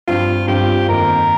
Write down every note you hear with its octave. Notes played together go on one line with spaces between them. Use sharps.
G2 F3 C4 F4
G2 F3 C4 G4
F2 D#3 A#3 D#4 A#4